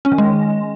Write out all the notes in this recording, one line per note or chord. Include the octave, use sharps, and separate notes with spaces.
C#4
D#3
G#3